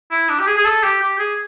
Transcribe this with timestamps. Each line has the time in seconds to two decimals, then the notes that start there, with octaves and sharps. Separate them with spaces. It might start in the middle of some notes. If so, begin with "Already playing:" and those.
0.11 E4
0.29 D4
0.40 G4
0.47 G#4
0.57 G#4
0.65 A4
0.83 G4
1.02 G4
1.19 G#4